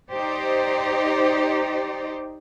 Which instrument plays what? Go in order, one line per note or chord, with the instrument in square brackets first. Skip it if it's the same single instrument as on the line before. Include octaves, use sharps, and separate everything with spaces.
[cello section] D#4 G4 C5 D5